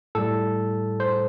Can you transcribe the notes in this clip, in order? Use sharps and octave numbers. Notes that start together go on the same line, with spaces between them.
A2 G3 A4
C5